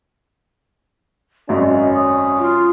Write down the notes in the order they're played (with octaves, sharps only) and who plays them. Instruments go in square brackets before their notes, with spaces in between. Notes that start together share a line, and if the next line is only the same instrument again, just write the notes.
[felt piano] G#1 F#2 [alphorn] C#4 [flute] D#5
[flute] D#6
[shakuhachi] F4